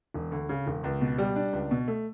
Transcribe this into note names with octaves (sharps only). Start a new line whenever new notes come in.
E1
D2
C#3
E1
C#2
B2
G3
D4
C#2
B2
A3